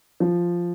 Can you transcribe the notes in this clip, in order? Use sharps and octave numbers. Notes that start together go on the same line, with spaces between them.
F3